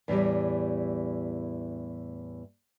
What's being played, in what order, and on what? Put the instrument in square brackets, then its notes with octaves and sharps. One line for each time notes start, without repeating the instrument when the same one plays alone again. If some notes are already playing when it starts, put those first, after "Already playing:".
[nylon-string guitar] E2 A2 E3 G3